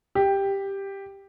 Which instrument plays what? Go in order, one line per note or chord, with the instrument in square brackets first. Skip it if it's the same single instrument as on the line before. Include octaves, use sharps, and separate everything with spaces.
[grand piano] G4